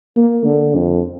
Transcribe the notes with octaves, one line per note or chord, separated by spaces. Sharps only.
A#3
D3
F2